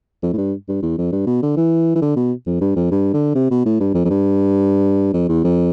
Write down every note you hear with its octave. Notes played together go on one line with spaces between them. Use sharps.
F2
A2
G2
G2
E2
F2
G2
B2
D3
E3
E3
D3
B2
F2
G2
F2
G2
D3
C3
B2
A2
G2
F2
F2
G2
F2
E2
F2